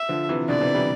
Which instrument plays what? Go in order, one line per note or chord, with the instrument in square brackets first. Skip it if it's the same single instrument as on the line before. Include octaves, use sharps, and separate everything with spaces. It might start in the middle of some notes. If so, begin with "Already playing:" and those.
Already playing: [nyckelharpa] E5
[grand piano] D3 F3
C3 E3
[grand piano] B2 D3 [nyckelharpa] D5
[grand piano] C3 E3
E3 G3